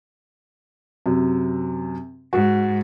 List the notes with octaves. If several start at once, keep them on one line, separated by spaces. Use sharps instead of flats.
F#2 C3
G#2 F#4